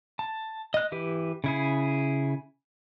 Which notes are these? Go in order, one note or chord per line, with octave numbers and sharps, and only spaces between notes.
A5
D#5 F#6
E3 G4 B4
C#3 E4 G#4